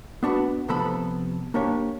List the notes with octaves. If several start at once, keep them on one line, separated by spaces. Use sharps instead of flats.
B3 D4 F#4 B4
C3 F3 B3 A4 B5
A#3 D4 G4 C#5